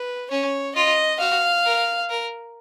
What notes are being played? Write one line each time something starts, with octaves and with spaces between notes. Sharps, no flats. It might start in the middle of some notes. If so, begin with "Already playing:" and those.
Already playing: B4
C#4 C#5
F4 D#5
F#4 F5
A#4
A#4